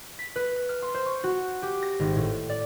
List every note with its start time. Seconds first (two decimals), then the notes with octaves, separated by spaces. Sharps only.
0.19 B6
0.36 B4
0.69 F6
0.82 C6
0.94 C5
1.06 C#6
1.24 F#4
1.62 G4
1.83 A#6
1.99 G#1
2.16 A2
2.50 D5